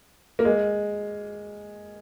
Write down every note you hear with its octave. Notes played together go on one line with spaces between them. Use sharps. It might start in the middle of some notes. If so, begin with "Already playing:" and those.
A#3
G#3